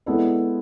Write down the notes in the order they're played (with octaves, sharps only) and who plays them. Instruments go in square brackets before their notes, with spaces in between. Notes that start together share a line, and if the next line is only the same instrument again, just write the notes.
[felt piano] G#3 B3 E4 A4 D5